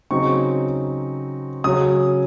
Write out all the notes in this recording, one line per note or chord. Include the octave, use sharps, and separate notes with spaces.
C#3 F#3 C4 D#4 C#6
C#3 F#3 C#4 D#6